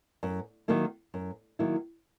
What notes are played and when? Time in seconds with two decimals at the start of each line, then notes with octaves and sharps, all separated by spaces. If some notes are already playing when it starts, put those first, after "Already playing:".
0.23 F#2
0.68 D#3 F#3 A#3 E4
1.14 F#2
1.59 D#3 F#3 A#3 E4